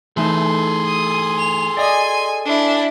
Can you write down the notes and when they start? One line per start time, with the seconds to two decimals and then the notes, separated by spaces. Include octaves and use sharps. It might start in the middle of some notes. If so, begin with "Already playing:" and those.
0.17 E3 A3 D#4 G#4 A4 C6
0.86 D#6
1.39 F7
1.77 D5 D#5 G#5
2.45 D4 E4